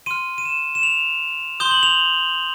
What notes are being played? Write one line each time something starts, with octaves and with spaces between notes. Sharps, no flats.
C6 F6 D#7
D#7
E7
E7
F7
C6 D#6 G6 G7
F#7
F7